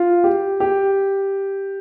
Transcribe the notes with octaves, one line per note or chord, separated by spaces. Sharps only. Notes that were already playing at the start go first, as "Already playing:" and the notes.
Already playing: F4
G4
G4